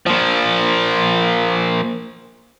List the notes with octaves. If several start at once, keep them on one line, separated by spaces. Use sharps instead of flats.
A#2 F3